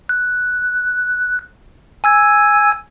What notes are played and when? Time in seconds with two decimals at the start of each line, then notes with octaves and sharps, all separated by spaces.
0.09 F#6
2.04 G#5 E6 G#6